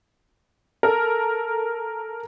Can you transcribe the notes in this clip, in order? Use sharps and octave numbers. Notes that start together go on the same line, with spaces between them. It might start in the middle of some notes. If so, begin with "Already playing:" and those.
A4 A#4